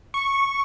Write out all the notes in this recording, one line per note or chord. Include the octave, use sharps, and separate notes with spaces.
C#6